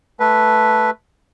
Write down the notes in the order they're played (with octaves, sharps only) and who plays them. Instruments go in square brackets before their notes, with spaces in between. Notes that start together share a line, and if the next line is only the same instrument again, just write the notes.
[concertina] A3 B4